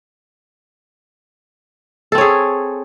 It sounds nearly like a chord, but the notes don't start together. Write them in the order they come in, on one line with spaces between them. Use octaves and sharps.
A4 C4 C#5 G#4